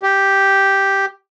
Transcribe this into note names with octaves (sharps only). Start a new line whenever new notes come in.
G4